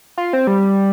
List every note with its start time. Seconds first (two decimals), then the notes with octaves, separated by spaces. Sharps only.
0.17 F4
0.33 C4
0.47 G3